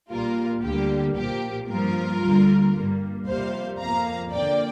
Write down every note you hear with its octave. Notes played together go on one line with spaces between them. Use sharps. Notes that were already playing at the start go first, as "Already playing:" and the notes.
A#1 A#2 G3 A#3 F4 A#4
D2 D3 G3 A#3 G4
A#1 A#2 F3 A#3 G4
G2 F3 A#3 F4 A#4
D2 D3 G3 A#3
G2 G3 A#3
F2 C3 G3 A#3 C5 F5
F2 F3 A#3 F5 A#5
F2 D3 A#3 D5 G5